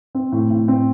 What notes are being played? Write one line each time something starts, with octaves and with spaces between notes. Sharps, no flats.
C4
A2
A2
C4